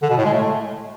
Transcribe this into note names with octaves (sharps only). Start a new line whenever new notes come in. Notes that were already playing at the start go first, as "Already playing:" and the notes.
D3
B2
A2
G#3
A3